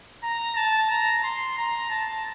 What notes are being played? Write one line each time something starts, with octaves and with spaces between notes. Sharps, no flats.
A#5
A5
A#5
C6
A#5
A5